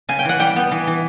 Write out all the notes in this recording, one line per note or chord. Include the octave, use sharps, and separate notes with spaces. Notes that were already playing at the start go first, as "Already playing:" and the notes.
C#3 G#5
G5
E3 F#5
G3 G5
B3
E3
E3